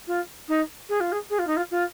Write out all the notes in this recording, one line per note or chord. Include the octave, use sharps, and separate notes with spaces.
F4
D#4
G#4
F4
G#4
G#4
F4
D#4
F4
F4